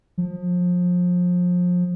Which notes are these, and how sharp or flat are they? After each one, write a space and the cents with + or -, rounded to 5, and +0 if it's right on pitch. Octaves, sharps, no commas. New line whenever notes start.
F3 +30